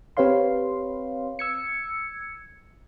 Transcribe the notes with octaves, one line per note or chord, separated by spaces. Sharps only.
C4 G4 B4 C#5 F5 C6
E6 G#6 C#7